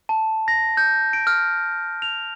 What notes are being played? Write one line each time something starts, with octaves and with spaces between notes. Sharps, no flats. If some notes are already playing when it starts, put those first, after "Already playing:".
A5
A#6
G6
D7
F6
F7